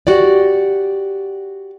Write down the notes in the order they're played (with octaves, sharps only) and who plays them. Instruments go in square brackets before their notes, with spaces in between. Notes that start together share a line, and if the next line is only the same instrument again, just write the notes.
[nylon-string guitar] F#4 G4 D5